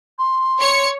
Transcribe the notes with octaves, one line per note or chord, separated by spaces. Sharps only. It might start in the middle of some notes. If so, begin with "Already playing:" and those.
C6
C#5 C#7